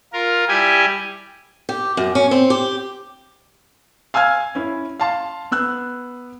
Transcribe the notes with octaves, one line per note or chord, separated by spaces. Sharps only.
F4 A#4
G3 E4 G4 G#5
G4
F#2
C#4
C4
G4
F5 G#5 E6 F6 G#6
C#4 E4
F5 A5 C6
B3 E6 F#6